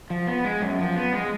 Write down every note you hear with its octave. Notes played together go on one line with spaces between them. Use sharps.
F3
B3
G#3
F#2
F3
B3
G#3